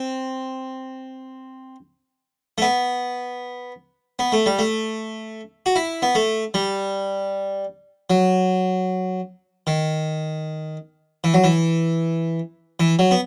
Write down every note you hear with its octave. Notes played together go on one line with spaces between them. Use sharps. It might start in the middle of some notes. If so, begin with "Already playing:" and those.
Already playing: C4
A3
B3
B3
A3
G3
A3
F#4
E4
B3
A3
G3
F#3
D#3
E3
F#3
E3
E3
F#3
B3